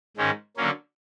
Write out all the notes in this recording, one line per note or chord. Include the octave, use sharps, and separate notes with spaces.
G#2 D#3 G#3 C#4
D3 F#3 A#3 C#4